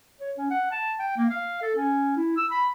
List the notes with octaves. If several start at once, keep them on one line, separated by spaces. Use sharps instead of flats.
C#5
C#4
F#5
A5
G5
A#3
F5
A4
C#4
E4
E6
B5